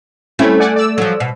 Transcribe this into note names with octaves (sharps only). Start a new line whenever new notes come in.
A3 C4 C#4 E4
D5 F#5 G#5
D5 E6
F3 F#3
B2